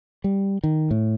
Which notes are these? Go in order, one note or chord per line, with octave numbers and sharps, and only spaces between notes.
G3
D#3
A2